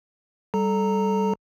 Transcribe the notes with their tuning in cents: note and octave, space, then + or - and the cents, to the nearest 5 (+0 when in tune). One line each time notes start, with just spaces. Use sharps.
G3 +0 A4 -15 A#5 -10